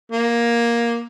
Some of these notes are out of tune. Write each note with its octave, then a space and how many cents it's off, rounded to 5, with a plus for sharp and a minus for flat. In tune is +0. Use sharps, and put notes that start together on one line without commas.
A#3 +10